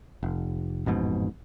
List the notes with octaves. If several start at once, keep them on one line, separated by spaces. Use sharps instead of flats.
F1
A1 F2 G#2 B2